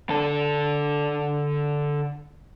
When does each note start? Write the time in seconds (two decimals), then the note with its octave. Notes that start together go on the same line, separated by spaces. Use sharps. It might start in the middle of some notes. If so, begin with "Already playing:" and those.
0.09 D3 A4